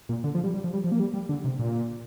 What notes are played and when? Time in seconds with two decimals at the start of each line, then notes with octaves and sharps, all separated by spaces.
0.09 A#2
0.24 D3
0.35 F3
0.44 G3
0.54 G3
0.64 F3
0.74 G3
0.84 F3
0.92 A#3
1.00 G3
1.14 G3
1.29 D3
1.44 C3
1.59 A#2